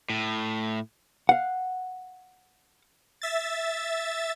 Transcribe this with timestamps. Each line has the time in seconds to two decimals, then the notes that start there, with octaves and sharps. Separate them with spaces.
0.10 A2
1.29 F5 F#5
3.22 E5 A6